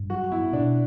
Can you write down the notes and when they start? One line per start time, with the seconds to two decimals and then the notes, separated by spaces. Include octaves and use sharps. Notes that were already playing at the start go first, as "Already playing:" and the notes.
Already playing: G2
0.10 F#3 F#4
0.31 B3 E4
0.53 B2 D4